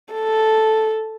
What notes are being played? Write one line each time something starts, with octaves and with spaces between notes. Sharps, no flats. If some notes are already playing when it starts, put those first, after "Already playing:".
A4